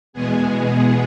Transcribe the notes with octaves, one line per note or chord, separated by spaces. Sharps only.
E2 B2 G#3 B3 G#4